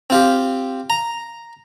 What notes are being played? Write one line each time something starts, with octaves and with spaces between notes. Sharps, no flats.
C4 F4 G4
A#5